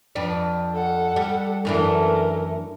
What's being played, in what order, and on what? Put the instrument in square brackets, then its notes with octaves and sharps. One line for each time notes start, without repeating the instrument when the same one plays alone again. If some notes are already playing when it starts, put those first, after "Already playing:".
[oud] F2 D4 B4
[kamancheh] A4 F#5
[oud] G3
[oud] F#2 E3 D4 [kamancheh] A3 A#4